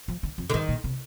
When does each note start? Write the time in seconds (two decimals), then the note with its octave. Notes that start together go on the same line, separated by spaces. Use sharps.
0.08 F3
0.23 D3
0.38 F2
0.50 D3
0.54 G2 D#3
0.68 A#2
0.84 C3